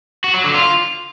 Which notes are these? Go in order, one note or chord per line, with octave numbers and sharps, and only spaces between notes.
F#4
F#3
D3
F4